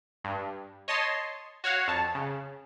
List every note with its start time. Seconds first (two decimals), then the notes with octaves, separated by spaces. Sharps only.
0.24 G2
0.88 C#5 D#5 A5 C6
1.64 F#4 C#5 F5 F#5
1.88 F2 A5
2.15 C#3